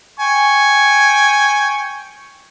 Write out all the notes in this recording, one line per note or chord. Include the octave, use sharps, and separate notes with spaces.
G5 G#5 C#6